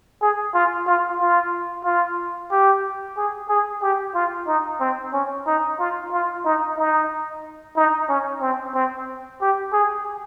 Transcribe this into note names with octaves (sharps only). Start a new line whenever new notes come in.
G#4
F4
F4
F4
F4
G4
G#4
G#4
G4
F4
D#4
C4
C#4
D#4
F4
F4
D#4
D#4
D#4
C#4
C4
C4
G4
G#4